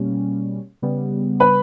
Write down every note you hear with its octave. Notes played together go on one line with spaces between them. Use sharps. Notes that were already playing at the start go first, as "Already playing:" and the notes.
Already playing: B2 G3 A#3 C#4
C#3 G3 B3
B4 B5